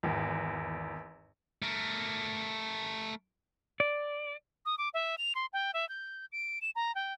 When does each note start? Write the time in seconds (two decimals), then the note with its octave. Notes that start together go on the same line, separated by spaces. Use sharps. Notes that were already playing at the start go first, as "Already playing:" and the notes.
0.03 G#1 E2
1.62 A3 A#4
3.80 D5
4.66 D#6
4.78 D6
4.94 E5
5.18 F7
5.35 C6
5.53 G5
5.74 E5
5.89 G6
6.32 D7
6.61 E7
6.75 A#5
6.95 G5